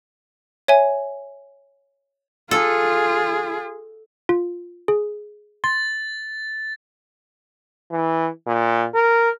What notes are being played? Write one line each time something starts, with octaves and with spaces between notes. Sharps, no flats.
C#5 E5 G#5
F4 G#4 A4
F4
G#4
C6 A6
E3
A#2
A#4